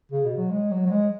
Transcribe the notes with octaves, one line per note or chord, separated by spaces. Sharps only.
C#3
B2
F#3
G#3
F#3
F#3
G#3